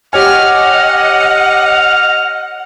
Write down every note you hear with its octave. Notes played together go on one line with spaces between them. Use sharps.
G4 C#5 D#5 F#5 G#5 F6